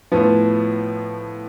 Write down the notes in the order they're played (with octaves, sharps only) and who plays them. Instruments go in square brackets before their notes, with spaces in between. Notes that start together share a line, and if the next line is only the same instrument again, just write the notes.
[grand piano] A2 F3 B3